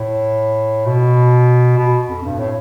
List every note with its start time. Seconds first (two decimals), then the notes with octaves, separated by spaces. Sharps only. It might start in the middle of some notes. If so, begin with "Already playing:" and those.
Already playing: A2
0.86 B2
1.78 B2
2.08 F2
2.23 G2
2.39 A2